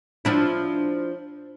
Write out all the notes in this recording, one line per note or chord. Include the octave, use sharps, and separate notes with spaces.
F3 D4 E4